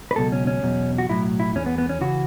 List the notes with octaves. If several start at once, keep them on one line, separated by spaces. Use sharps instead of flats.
B4
C#2 B2 F#3 A4
C#4
C#4
E2 B2 F#3
F#4
B1 A2 F#3 E4
E4
E2 E3 C#4
B3
B3
C#4
C#3 E3 F#4